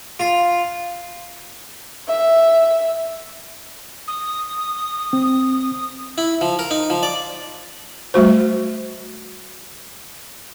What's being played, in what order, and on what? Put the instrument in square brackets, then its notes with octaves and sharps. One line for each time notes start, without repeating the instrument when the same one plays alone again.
[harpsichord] F4
[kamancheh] E5
[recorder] D#6
[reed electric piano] C4
[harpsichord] E4
F3
A#4
D#4
F3
D5
[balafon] G3 A3 F#4 C5